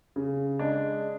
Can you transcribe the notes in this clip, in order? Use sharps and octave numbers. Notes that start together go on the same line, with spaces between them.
C#3
G#3 D4